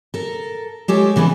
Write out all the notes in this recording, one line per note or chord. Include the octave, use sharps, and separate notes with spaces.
A4 A#4
G#3 G4 A4 C#5
C#3 E3 B3 E4 G#4